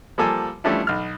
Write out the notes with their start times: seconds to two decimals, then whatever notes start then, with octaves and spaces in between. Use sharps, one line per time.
0.18 F3 G3 A#3 A4 G#5
0.64 F3 G3 A3 C#4 D4 E4
0.87 B1 F6